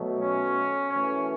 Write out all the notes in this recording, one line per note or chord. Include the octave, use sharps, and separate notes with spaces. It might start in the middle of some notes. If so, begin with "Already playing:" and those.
Already playing: B2 F#3 A3
C#4
F#2 E3 A3 C#4